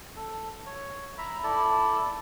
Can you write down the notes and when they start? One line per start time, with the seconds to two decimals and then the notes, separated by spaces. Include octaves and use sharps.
0.16 A4
0.66 C#5
1.18 E5 A#5 B5
1.44 E4 A4 D5 A5